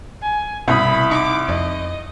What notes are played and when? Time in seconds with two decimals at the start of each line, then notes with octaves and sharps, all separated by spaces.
0.22 G#5
0.68 C2 B2 E4 B5 D#6
1.11 D#4 D6
1.49 F2 D#5